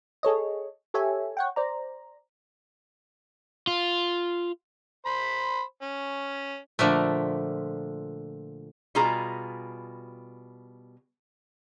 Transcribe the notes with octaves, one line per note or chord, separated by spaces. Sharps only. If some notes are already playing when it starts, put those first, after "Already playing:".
G#4 A4 C#5 D#5
G4 A4 C#5 E5 G#5
C#5 F#5 G5
C5 D5 A#5
F4
C5 B5
C#4
A#2 D3 F3 A3
B2 G3 F4 G#4 A#5